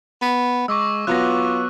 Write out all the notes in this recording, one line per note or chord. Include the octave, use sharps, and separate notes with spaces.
B3
G#3 C#6 D6 E6
F#3 B3 F4 F#6 A#6